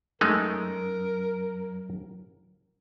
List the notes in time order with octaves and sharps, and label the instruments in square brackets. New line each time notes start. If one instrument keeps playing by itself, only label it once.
[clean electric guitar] F#2 [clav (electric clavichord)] G#3 A3 D#4 [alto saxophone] A#4